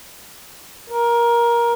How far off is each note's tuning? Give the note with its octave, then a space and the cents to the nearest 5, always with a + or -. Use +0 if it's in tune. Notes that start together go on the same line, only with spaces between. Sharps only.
A#4 +15